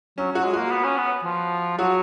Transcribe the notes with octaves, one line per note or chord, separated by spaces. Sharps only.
F#3 C#4
F#3 F#4
G#3
A#3 F#4
B3
C#4
B3
F3
F#3 F#4